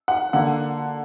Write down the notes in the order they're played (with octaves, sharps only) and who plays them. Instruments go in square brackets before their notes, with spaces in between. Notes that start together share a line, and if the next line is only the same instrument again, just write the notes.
[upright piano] F#5
D3 A#3 F#5